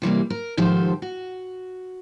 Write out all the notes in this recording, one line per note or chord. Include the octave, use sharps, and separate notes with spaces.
C3 E3 G3 A#3
A#4
G#2 D#3 F3 G4 A4 C5
F#4